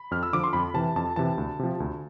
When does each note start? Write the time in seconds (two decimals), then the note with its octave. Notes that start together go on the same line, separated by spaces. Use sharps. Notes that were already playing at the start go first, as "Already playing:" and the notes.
Already playing: B5
0.11 F2 F6
0.23 E6
0.33 D3 F3 D6
0.44 C6
0.53 F2 B5
0.74 C3 E3 A5
0.96 F2 A5
1.16 C3 E3 A5
1.38 D2
1.59 C3 F3
1.80 D2